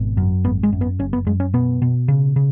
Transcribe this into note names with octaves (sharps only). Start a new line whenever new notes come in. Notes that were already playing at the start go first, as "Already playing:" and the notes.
Already playing: G#1 B2
F#2
G#1 B3
G#3
F#2
B3
F#1 C#4
B3
F#2 G#3
C#4
B2 B3
B2
C#3
C#3